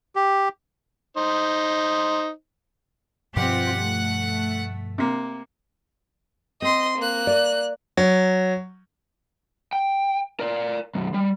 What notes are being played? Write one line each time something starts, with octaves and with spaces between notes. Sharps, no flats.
G4
D#4 C5
G2 B2 F3 C4 F4 G4 F#5 F#6
A3
C3 A#3
C4 D#5 C6
A#3 F#6
D5
F#3
G5
A#4 D5
B1 F#2
G3